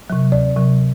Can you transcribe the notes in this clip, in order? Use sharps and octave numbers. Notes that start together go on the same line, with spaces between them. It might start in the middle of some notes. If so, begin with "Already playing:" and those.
C3 F#3
D2 D5
C3 F#3